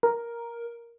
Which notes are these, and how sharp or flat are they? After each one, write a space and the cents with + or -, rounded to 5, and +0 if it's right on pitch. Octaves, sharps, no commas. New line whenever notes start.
A#4 +5